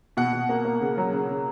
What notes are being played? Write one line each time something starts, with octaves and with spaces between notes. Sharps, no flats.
B2 F#5
B2
A#3
A#3
C#3
F#3
C#3
C#3